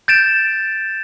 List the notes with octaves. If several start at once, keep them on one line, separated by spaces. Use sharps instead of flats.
G6 A6 D7 E7